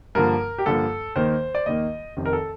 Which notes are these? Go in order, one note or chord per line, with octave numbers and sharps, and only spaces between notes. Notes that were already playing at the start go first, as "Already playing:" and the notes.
G2 D3 F3 A#3 A#4
G4
G2 D3 F3 A#3 A4
D#2 D#3 A#3 C5
D5
D#2 D#3 A#3 D#5
F1 F2 C3 D#3
A#4
A4